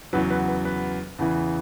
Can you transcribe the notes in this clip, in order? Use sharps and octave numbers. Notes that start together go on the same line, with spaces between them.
E2 C#3 F#3 B4
B4
B4
B4
E2 C#3 E3